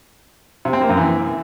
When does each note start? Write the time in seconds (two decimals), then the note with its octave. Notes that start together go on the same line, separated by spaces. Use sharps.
0.65 C3
0.73 C4
0.81 A#3
0.89 F#2
0.97 E3